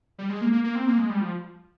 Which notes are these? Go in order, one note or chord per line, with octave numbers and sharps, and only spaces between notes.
G3
G#3
A#3
A#3
A#3
C4
A#3
G#3
G3
F3